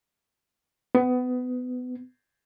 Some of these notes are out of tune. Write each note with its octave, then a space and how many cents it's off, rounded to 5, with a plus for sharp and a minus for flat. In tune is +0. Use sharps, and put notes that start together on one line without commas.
B3 +25